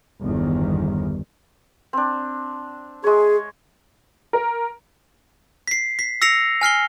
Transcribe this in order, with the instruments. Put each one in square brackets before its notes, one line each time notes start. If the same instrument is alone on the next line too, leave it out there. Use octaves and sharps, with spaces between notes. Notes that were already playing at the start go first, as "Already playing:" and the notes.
[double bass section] G1 E2 D#3
[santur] C4 D4
[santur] G#3 C#5 [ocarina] G#4
[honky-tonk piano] A#4
[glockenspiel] B6 C7
B6
E6 A#6 C7 C#7 F7
G#5 F6 C7 G7